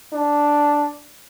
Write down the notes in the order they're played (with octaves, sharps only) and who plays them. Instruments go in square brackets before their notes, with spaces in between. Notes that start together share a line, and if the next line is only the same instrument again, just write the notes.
[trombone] D4